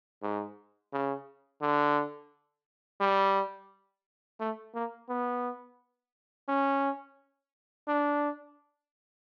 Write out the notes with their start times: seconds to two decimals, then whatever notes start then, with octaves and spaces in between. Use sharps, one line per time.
0.22 G#2
0.93 C#3
1.61 D3
3.01 G3
4.40 A3
4.74 A#3
5.09 B3
6.49 C#4
7.88 D4